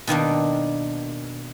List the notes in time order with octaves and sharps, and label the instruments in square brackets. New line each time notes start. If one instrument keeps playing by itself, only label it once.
[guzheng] B2 D#3 A#3 D4